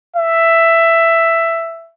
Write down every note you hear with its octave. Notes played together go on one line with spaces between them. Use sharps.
E5